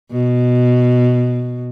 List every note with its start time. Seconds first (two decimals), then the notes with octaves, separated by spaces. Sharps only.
0.12 B2